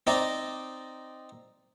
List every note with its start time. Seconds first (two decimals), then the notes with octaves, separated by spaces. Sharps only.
0.07 C4 D#4 D5 A#5